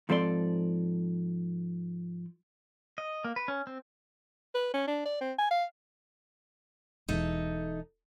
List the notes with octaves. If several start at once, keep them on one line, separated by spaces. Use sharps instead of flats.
G#2 F3 C4 A4 D5 C6
D#5
A#3
B4
C#4
C4
B4
C#4
D4
D5
C4
G#5
F5
E1 E2 D#4 A4 E5